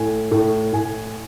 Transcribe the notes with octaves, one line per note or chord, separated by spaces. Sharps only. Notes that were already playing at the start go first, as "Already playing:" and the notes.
Already playing: A2 G#5
A2
A2 G#5